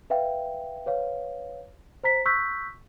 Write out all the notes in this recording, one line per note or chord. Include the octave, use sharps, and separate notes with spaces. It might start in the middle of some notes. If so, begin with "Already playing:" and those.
B4 E5 F5 G5
B4 C#5 F5
C5 A#5 B6
C#6 E6 F#6 G6 B6